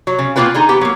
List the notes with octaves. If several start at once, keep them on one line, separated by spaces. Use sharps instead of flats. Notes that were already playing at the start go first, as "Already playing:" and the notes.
F#3
C#3
B2 A#3 D4 F4 B4 G5
D3 D#4 G#4 A#5
B3 G4
F#3 A#3